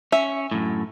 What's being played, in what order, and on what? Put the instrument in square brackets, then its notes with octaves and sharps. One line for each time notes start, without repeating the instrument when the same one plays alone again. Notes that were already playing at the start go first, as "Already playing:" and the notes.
[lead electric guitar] C#4 [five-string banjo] E5
[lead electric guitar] F#2 A2